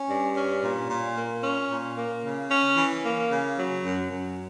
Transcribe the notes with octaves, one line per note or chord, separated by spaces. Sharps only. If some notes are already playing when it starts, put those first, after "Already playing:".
Already playing: C#4
G2
C#4
A#2
A#2
A#3
C#4
A#2
A#3
C#3
C#4
E3
A#3
C#3
F#3
F#2
F#2